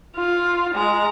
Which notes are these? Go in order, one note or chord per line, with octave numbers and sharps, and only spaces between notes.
F4
G#3 A#5